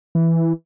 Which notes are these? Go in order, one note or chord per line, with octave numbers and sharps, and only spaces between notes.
E3